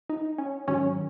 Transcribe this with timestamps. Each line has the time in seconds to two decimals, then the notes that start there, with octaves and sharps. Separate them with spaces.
0.10 D#4
0.38 C#4
0.68 G#2 D#3 F#3 C#4